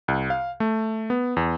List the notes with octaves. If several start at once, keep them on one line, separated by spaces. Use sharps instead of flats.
C2
F5
A3
B3
E2